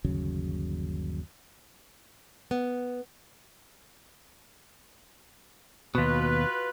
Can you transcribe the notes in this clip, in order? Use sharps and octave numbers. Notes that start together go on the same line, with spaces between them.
G1 D#2 C#3 F#3
B3
D#2 B2 F4 F#4 B4